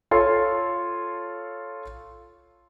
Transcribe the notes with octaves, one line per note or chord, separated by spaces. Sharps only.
F4 A4 C#5 C6